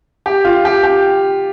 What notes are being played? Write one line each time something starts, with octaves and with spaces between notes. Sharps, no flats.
G4
F4
G4
G4